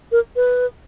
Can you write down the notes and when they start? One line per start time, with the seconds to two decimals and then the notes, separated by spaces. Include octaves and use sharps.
0.12 A#4
0.36 B4